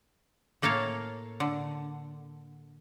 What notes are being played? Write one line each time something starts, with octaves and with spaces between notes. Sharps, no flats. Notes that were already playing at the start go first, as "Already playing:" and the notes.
A2 A#3 A4 C#5 F5
D3